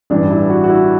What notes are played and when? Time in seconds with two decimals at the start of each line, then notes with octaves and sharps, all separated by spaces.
0.10 A1 G2 E3 G3 D4
0.30 E4
0.49 F#4
0.64 F#4
0.69 E4